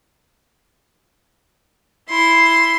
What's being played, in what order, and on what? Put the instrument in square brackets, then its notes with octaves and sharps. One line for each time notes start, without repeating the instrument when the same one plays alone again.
[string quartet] E4 [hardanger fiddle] C6